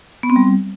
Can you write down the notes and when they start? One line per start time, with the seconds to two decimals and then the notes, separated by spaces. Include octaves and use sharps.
0.23 B3
0.30 C4
0.36 G3